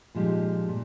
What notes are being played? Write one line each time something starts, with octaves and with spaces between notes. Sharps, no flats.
A#2 F3 G#3 D#4 G4
A#2